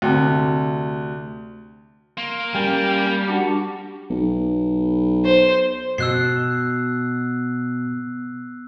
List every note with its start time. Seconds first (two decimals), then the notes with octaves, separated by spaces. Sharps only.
0.02 D2 C3
2.17 A#3 C6
2.55 G3 C#4 A#4 G5
3.28 D4 F#4 G4 F#5
4.10 B1
5.25 C5
5.98 B2 E6 F#6 C7